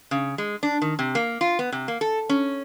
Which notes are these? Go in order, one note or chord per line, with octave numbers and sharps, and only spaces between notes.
C#3
G#3
D4
D#3
C3
A#3
F4
B3
C3
A#3
A4
C#4